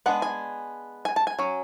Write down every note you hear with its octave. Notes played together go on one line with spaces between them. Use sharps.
G#3 B3 D4 F#5
G#5
G#5
A5
G#5
F#3 C#4